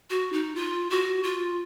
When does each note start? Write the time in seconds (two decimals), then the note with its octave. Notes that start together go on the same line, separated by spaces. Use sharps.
0.10 F#4
0.33 D#4
0.55 F4
0.90 F#4
1.23 F4